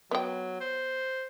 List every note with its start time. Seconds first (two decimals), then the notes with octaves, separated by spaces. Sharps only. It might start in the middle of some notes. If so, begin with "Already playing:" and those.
0.11 F#3 B3 G5
0.61 C5